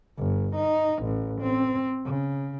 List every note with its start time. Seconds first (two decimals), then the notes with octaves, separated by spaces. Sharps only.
0.18 G1
0.56 D#4
1.03 A1
1.42 C4
2.05 C#3